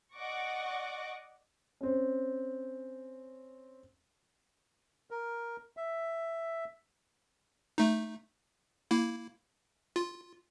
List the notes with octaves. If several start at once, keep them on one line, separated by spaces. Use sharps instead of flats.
D5 D#5 F#5 C#6 D6 A#6
C4 C#4
A#4
E5
A3 D#4
A#3 E4
F4